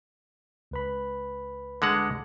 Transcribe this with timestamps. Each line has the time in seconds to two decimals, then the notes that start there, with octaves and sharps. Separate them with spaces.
0.71 C#2 B4 B5
1.82 D3 G#3 F#5